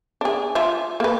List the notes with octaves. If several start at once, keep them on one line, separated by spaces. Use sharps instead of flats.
D4 G#4
F4 E5
A#3 B4